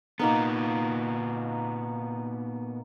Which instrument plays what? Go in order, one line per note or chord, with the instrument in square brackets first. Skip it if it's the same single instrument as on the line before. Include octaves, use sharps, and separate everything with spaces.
[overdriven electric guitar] A#2 B3 [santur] A#3 D#4 A#4